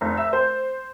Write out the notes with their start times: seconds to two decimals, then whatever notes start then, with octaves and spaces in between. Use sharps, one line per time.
0.01 F1
0.17 E5
0.33 C5